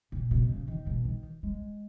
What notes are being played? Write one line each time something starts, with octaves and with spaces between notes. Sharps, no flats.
A#2
B2
C#3
D#3
B2
D#3
G#3